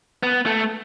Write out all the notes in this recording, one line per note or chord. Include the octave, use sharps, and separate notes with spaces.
B3
A3